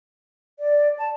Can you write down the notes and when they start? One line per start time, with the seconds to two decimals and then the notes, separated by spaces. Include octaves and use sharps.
0.59 D5
0.98 A5